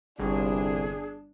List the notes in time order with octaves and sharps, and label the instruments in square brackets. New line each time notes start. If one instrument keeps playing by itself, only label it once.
[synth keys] G1 [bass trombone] C2 [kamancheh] D4 [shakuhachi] G#4